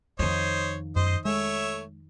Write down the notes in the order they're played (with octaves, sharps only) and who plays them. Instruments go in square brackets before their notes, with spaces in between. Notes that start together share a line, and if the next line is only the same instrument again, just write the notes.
[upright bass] F2 D#3 [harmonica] C5 C#5 D#5
[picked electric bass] F#2 [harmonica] C5 D#5
[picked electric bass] G#3 [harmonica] A3 C#5 E5